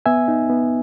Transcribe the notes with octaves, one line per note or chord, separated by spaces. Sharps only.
B3 E5 G#5
D#4
B3